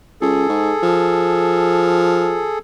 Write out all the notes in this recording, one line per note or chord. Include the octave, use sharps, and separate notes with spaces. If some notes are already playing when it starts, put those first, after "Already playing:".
C#2 G#4 A4
G#2
F3